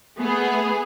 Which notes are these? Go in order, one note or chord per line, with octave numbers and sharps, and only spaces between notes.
A3 B3 G#4